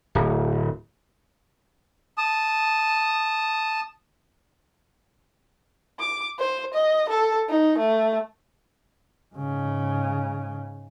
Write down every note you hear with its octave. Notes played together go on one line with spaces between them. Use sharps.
D1
A5 D#6
D6
C5
D#5
A4
D#4
A3
G#2 C#3